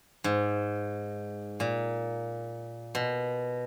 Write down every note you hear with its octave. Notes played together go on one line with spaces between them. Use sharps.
G#2
A#2
B2